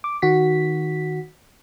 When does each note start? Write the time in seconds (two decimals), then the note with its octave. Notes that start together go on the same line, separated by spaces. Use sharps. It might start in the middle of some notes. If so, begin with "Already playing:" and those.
0.04 D6
0.22 D#3 F#4 B6